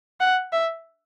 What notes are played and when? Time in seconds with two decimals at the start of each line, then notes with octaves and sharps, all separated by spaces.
0.20 F#5
0.52 E5